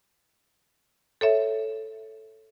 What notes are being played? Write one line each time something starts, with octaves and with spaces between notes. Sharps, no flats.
A4 C#5 E5